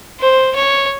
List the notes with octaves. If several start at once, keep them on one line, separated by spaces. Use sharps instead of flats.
C5
C#5